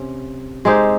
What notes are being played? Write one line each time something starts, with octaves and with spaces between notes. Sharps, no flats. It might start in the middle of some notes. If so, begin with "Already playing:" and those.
Already playing: C3 C#4
G#3 C4 D#4 G4